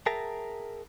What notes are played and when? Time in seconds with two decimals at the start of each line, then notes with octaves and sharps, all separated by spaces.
0.06 G#4 A#4 E5 G5 A5 A#5